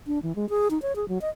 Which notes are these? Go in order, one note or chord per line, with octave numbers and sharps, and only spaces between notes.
D4
E3
G#3
G#4
D#4
C#5
G#4
F#3
D#5